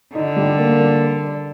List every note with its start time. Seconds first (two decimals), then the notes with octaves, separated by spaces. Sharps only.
0.14 D3 D#4
0.36 G3
0.59 A#3
0.80 G3
1.03 A#4
1.25 D5